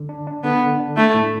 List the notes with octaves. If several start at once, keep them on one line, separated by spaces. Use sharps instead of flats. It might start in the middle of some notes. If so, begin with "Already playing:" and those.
Already playing: D3
D4
D4
D3 B3
D3
D4
A3 E4
A2